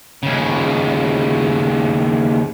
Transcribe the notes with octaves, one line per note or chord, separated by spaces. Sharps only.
D#2 C#3